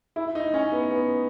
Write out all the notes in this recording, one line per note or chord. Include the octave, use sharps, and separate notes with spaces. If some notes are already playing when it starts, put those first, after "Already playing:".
E4
D#4
C#4
B3
B3